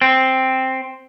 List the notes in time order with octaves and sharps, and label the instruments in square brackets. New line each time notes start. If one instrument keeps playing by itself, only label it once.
[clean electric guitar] C4